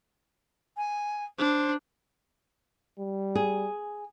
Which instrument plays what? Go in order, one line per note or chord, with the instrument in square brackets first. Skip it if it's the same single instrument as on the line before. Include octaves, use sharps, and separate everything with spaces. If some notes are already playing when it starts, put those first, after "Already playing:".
[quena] G#5
[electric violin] D4 [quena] C5
[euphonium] G3
[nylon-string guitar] G#4